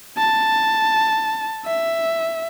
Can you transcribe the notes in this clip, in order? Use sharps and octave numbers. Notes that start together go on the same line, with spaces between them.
A5
E5